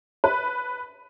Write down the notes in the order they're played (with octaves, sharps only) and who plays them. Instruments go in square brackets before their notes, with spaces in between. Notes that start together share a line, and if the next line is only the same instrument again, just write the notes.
[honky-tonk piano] B4